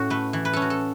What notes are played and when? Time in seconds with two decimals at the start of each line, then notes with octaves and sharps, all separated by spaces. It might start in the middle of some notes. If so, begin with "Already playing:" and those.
Already playing: A2 C#4 F#4
0.10 A3 B4
0.33 E3
0.45 B4
0.53 C#4 A4
0.62 F#4
0.70 A4